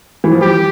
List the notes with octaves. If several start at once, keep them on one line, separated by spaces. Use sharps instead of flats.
E3
F3
G3 G4